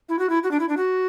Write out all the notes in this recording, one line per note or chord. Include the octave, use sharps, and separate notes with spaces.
E4
F#4
E4
F#4
D4
E4
D4
F#4